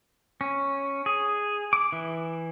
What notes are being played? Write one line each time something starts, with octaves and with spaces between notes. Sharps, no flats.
C#4
G#4
D6
E3